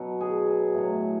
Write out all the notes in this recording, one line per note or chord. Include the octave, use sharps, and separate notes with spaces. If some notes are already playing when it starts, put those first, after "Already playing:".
Already playing: B2 F#3
G#4
A2 F#3